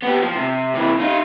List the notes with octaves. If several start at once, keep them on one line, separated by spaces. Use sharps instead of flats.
B3 G4
F3
C3
C3 E3
D#4 F4